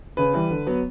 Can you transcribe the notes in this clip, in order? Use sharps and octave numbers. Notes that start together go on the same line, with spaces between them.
C#3 B4
E3 G3
D3
F#3 B3